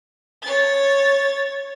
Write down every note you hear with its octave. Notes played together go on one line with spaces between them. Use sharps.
C#5 A6